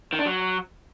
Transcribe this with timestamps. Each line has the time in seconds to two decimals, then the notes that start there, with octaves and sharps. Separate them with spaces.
0.13 D#3
0.19 D4
0.25 F#3